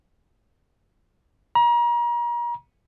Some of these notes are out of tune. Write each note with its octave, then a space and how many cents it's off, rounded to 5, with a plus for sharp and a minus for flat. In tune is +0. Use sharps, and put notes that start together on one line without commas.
A#5 +35